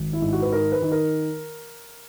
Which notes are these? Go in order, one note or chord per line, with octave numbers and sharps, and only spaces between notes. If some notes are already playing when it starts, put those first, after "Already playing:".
Already playing: G#1
E4
G#2
F#4
B4
D#3 A#4
B4
D#3
A#4